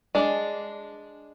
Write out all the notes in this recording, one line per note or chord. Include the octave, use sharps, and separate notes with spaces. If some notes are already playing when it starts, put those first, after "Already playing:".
G#3 D4